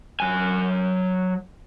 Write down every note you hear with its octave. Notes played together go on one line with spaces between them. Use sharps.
F#3 G#5